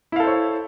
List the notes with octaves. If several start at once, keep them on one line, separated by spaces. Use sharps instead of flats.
E4 A4 C5 C#5 F5